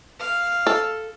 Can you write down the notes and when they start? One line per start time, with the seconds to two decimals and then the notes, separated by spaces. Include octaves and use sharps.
0.20 F5
0.67 A4